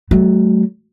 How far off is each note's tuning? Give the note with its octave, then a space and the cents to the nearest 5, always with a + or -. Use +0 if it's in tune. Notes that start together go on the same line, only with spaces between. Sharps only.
F#3 +20 A3 -30